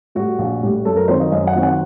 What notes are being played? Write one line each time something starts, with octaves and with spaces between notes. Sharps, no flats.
A2 G3 F#4
A#1
A2 G3
F#2 A4
A#4
D#3 F#3 C4 C5
D#5
F#2 D#5
F#5
D#3 F#3 C4
F#5